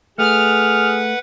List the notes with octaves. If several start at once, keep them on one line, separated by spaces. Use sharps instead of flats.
A3 G#4 B4 F#5 F6